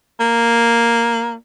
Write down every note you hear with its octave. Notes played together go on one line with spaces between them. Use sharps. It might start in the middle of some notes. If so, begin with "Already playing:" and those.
A#3